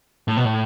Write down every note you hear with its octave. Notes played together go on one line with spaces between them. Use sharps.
A2
B2
A2